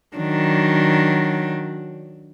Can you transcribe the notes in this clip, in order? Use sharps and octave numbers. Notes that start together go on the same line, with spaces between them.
D#3 F#3 D4